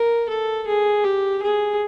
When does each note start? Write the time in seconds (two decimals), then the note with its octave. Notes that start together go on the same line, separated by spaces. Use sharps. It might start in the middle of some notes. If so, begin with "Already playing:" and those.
Already playing: A#4
0.29 A4
0.67 G#4
1.04 G4
1.42 G#4